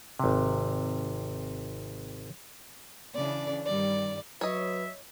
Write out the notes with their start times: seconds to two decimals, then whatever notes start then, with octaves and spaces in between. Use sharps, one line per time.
0.19 G#1 C3
3.15 C#3 E3 D4 D5
3.66 G2 D#3 G3 D5
4.41 F#3 B4 C#5 D#5 E5